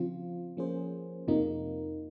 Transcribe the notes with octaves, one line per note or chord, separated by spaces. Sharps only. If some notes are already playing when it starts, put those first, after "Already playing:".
Already playing: C#3 F3 C4 F4
F3 A#3 C#4 G#4 C5
F2 C3 F3 A#3 D#4